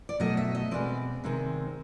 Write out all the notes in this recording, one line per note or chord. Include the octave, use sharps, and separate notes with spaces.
D5
B2 F#3 A3 D#5
E5
D#5
B2 G#3 C4 D5
C3 D#3 G#3 C4